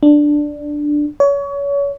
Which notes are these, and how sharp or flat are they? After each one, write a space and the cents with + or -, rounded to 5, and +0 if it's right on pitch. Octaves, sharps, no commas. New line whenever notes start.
D4 +5
C#5 +30